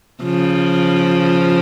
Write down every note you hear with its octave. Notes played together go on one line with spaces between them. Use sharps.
C#3 F3